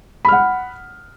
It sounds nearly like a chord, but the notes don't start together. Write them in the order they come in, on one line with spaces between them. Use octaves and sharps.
B5 F6 F#5